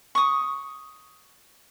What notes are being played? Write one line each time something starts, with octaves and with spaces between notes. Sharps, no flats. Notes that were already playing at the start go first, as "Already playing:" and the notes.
C#6 D#6